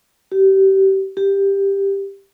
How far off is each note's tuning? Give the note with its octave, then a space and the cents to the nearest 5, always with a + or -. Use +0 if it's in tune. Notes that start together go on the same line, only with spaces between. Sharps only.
G4 -25
G4 +10